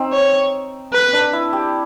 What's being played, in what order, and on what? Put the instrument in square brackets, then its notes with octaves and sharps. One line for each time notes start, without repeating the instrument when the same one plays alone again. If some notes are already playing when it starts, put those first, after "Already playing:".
Already playing: [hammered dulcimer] C4 D#4
[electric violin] C#5
B4
[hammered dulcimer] D4
E4
G4